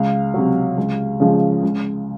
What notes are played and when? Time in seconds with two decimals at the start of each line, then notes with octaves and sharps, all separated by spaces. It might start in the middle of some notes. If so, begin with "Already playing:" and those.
Already playing: C#2 F5
0.34 C3 F#3
0.78 C#2
1.20 C#3 F3 G#3
1.63 C#2